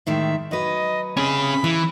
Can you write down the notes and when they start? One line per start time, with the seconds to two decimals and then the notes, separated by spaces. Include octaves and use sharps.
0.07 A2 D#3 G#3 E5
0.51 F#3 B4 D#5
1.17 C3 C#4 G#4 B5
1.64 E3 E4